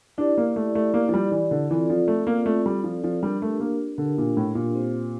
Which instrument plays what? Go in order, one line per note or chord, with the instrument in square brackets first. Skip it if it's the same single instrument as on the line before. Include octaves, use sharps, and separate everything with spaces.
[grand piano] D4 [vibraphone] E4 G4 D5
[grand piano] A#3
A3
A3
[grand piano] A#3 [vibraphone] E4 G4 D5
[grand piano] F3
G3
E3
D3
[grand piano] E3 [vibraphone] C4 F4 A4 D5
[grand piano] F3
A3
A#3
[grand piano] A3 [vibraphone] C4 F4 A4 D5
[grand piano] G3
F3
F3
[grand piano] G3 [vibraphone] D4 G4 A#4
[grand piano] A3
A#3
[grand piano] D3 [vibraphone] D4 G4 A#4
[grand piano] A#2
A2
A#2
[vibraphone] C4 G4 C5